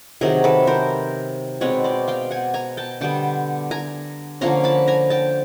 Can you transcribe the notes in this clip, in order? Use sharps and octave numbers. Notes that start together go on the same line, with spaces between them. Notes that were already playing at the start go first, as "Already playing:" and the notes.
C3 D#3 F#3 G#4 A#4
A4 B4
A#4 C5
B2 G#3 C4 B4 C#5
C5 D5
F5 G5
F#5 G#5
G#5 A#5
G5 A5
D3 G3 B3 G5 A5
G#5 A#5
D3 F3 A#3 C#4 A#5 C6
A5 B5
G#5 A#5
G5 A5